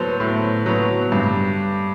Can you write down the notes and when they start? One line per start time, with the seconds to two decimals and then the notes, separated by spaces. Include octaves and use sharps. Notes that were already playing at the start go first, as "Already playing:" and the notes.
Already playing: A2 F#3 B3 A4 B4 C5
0.20 A2
0.66 F#3 B3
1.12 G2